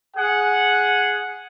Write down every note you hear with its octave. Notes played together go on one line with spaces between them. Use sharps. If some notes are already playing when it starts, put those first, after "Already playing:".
G#4 F#5